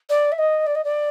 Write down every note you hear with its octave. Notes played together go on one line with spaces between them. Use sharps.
D5
E5
D#5
D5
D#5
D5